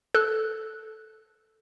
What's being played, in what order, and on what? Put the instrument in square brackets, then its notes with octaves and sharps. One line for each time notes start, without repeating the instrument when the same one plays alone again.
[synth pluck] A4 F#6